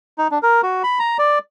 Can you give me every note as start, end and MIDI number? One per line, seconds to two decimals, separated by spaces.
0.18 0.28 63
0.31 0.38 62
0.43 0.61 70
0.63 0.83 66
0.84 0.99 83
0.99 1.17 82
1.18 1.39 74